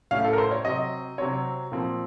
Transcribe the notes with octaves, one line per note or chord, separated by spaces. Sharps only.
A2 A3 C#4 F5
A4
A#4
C5
C#5
C3 F#3 C4 D#5
C3 F#3 C4 C#5
A#2 F3 C4